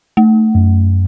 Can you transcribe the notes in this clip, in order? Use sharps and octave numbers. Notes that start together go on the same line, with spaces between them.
A3
F#2